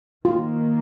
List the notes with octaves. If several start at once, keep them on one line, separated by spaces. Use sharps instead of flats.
D#3 A#3 F4